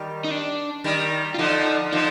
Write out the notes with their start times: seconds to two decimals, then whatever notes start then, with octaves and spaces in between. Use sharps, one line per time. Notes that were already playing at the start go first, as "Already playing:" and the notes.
Already playing: D#3 G3
0.24 D#4
0.31 D4
0.84 D#3 G3
1.34 F4
1.38 D3 F3 D#4
1.92 D3 F3 D#4